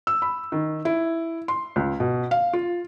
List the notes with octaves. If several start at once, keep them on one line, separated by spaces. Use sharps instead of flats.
E6
B5
D#3
E4
C6
C#2
B2
F5
F4